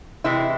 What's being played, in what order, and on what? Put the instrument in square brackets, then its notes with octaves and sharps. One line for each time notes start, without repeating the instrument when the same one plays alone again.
[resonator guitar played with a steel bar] C3 E3 G#3 E4